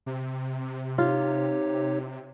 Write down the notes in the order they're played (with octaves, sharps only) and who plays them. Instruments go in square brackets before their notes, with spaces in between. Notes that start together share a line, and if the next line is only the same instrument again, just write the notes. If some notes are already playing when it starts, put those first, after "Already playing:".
[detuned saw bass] C3
[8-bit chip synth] D#4 G4 C#5 [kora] F4